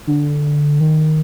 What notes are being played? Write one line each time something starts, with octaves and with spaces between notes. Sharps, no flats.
D3
D#3